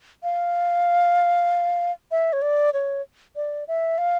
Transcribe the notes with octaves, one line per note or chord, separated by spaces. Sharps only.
F5
E5
C#5
D5
C#5
D5
E5
F5